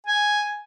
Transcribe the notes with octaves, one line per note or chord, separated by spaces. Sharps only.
G#5